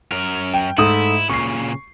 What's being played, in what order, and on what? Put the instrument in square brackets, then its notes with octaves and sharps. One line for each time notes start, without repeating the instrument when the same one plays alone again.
[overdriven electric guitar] F#2 A#4
[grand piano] G5
[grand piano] G#2 A3 D#6 [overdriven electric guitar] E4
[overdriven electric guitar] A#2 C#3 [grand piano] C#6 C7